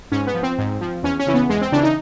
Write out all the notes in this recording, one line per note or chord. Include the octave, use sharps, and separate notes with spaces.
G#2 C#4
B3
F3
C4
G#2
F3
E2 C#4
C#4
C#3 E3
B3
E2 G#3
C4
C#3 E3 D4
D#4